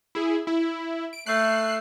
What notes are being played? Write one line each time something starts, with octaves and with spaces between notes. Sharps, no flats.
E4 G#4
E4
D7
A3 F#6 C7